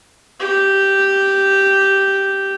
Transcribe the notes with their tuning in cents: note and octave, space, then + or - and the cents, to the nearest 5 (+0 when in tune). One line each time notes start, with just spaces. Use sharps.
G4 -5